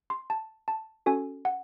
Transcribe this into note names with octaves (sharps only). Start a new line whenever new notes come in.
C6
A5
A5
C#4 F#4 A4 G#5
F#5